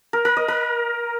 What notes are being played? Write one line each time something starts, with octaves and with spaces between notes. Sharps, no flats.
A#4
A#4
D#5
A#4